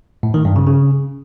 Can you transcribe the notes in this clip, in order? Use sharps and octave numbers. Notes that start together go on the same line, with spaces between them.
A2
D#3
G2
C#3
C#3